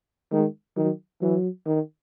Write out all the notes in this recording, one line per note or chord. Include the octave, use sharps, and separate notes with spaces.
D#3 G#3
D#3 F#3
E3 F#3
D#3